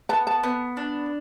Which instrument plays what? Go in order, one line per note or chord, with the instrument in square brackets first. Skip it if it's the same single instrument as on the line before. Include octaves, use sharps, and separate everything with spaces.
[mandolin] B3 [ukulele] A5
[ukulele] A5
[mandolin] B3
D4